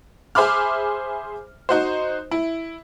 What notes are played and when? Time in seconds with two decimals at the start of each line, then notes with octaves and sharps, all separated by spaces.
0.35 G#4 C5 E5 B5 D6 F6
1.69 D#4 F#4 C5
2.31 E4